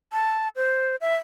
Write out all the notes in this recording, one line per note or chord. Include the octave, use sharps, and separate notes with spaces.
A5
C5
E5